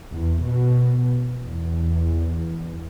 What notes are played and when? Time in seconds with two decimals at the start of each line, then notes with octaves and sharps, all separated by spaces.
0.12 E2
0.46 B2
1.42 E2